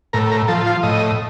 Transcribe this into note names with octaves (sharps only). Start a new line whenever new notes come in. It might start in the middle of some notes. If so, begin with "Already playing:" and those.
A2 A#4
A#4
F3 A4
F4
A2 D#5